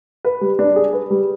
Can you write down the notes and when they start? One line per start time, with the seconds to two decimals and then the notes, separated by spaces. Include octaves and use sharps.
0.25 B4
0.41 G3
0.59 D4
0.76 G#4
0.93 B4
1.10 G3